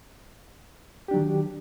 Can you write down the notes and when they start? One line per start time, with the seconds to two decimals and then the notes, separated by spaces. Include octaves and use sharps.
1.08 G4
1.11 D4
1.14 F#3
1.16 D#3